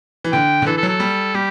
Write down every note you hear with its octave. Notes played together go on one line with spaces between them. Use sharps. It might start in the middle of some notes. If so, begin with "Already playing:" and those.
E3
D3 G5
D3
E3 A4
A4
F#3
A4
G3
G3 G4